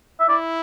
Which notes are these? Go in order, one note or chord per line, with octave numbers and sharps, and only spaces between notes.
E5
E4 D5